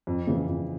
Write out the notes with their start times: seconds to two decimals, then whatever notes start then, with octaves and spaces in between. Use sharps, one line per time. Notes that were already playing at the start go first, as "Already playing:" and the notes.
0.07 F2
0.27 C#3 E3 G#3
0.47 F2